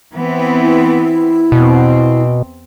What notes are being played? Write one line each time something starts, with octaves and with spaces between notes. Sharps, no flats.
E3 B3 C4
E4
E2 B2 C4